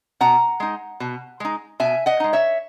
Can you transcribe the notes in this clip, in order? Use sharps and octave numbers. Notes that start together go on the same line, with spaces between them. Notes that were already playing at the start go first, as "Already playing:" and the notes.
B2 F#5 A#5
G#3 D#4
B2
G#3 D#4
B2 E5 G#5
D#5 F#5
G#3 D#4
C#5 E5